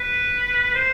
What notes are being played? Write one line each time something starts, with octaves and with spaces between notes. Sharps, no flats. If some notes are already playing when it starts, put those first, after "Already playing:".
Already playing: B4
C5